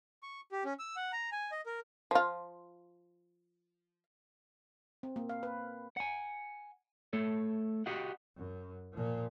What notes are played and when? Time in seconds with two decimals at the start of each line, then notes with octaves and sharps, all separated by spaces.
0.23 C#6
0.52 G4
0.65 C#4
0.79 E6
0.96 F#5
1.13 A#5
1.32 G#5
1.52 D#5
1.66 A#4
2.11 F3 F4
5.03 C4
5.16 A#3
5.29 F5
5.43 B4
5.97 F#5 G#5
7.13 A3 A4 C#5
7.86 F#4 G4 D#5 F5 F#5
8.37 F#2
8.93 A#2 F3